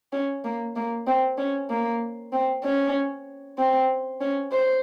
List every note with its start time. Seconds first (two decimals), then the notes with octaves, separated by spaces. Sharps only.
0.13 C#4
0.44 A#3
0.76 A#3
1.07 C4
1.38 C#4
1.70 A#3
2.33 C4
2.64 C#4
3.58 C4
4.21 C#4
4.52 C5